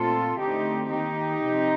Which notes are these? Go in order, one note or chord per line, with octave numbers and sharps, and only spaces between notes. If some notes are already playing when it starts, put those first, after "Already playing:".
Already playing: A#2 A3 C4 F4 A4
D3 A3 C4 D#4 G4
D#3 A#3 D#4 G4
C3 F3 C4